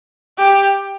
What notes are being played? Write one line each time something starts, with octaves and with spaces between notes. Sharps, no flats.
G4